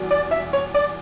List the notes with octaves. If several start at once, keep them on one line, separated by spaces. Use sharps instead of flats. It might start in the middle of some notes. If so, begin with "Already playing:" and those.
Already playing: E2 B2 G3
D5
E5
C#5
D5